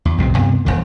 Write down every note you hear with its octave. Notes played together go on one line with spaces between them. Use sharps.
E2
B1 F2 A2 C3
D2 G2 C3 B3
D#1 B1 E2 D#3